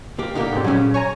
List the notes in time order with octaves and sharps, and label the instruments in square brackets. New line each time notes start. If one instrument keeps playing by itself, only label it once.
[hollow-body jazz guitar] C#2 A#3 G4
[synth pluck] B2 A#3 [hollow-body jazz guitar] D3 D#4 G4
[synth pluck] G#2 B2 C4
[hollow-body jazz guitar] A#2 C#3 [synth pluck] F#3 C#4
[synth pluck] C#5 G#5 A#5